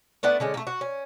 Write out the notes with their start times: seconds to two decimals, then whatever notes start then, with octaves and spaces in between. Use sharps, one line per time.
0.23 A3 B3 D4 F#5
0.40 D3 G#3 C#4
0.54 A3 A#3
0.67 F#4
0.81 C#4